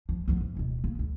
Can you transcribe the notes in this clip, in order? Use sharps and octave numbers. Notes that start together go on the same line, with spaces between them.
F3
F3 B3
F#2
D1 B2
A#3 B3
D2